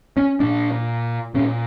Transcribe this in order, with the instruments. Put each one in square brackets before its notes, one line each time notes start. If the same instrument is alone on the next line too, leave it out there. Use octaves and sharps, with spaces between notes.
[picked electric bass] C#4
A#2 D4
A#2 C#4